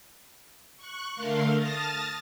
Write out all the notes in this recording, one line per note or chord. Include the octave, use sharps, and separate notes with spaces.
C#6 F#6
D3 A3 A#4 F5 C6
A5 D#6 F6 A6 A#6